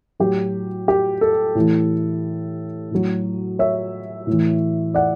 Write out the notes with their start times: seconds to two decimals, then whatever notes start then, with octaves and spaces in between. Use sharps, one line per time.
0.20 A2 F#3 G4
0.88 G4
1.21 A4
1.55 A2 E3
2.91 A2 F#3
3.59 C#5 E5
4.27 A2
4.32 E3
4.94 D5 F#5